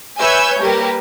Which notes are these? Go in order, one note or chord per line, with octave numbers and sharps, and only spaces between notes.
B4 C#5 E5 G#5 E6 G6
G3 A#3 G4 A#4 B4